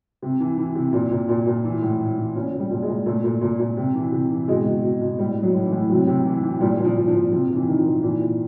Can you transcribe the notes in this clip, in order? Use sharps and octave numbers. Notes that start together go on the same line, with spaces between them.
C3
E3
E3
C3
A#2
A#2
A#2
A#2
E3
A2
A2
E3
A#2 C#4
A#2
G3
A#2
G#3
A#2
A#2 A3
A#2
A#2
A#2
C3
E3
C3
E3
B2 G#3
B2
B2
B2
A2 G3
A2
F#3
A2
E3
A2
C3 F#3
C3
E3
E3
A#2 G3
A#2
F3
A#2
F3
A#2
C3 F3
C3
E3
D#3
F3
D#3
A#2 E3
A#2